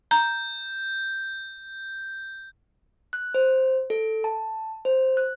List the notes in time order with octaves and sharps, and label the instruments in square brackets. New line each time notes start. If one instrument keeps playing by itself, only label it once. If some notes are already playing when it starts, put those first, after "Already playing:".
[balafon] A#5 [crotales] G6
[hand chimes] F#6
C5
A4
A5
C5
F#6